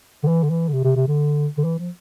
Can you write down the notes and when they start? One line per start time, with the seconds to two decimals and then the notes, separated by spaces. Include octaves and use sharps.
0.24 D3
0.27 E3
0.43 D3
0.50 E3
0.69 D3
0.73 C3
0.84 C3
0.96 C3
1.08 D3
1.58 D3
1.64 E3
1.79 F3